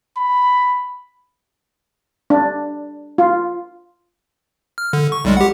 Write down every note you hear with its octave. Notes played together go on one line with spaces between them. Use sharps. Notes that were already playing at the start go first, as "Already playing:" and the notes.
B5
D4
F4
F6
D3
C#6
B1 G3 G#3
G4 F#5